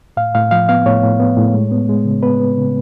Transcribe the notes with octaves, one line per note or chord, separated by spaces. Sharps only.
A2 F5
A2 F5
F3 F5
B3 F5
A2 C#5
A2
B3
A2
G#3
B3
G#3
C#3
B3 B4
B3
C#3